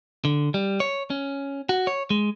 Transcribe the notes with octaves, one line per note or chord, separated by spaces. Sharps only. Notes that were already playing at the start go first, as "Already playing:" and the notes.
D3
G3
C#5
C#4
F#4
C#5
G#3